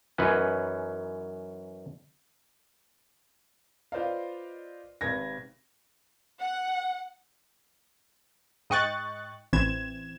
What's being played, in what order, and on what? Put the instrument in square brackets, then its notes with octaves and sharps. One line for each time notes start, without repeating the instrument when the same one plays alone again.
[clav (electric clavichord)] F#2 E3 C#4 D#4 B4 G#5
[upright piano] F4 B4 C5 D5 D#5 F5
G#1 C3 B4 G#6 A#6
[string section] F#5
[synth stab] G#2 D#5 G5 C#6 F#6 A6
A1 E3 C4 G#6 E7